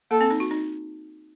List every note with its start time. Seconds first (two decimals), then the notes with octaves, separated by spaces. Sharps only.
0.11 A#3 A4
0.21 C4
0.31 D#4
0.40 F#4
0.51 D#4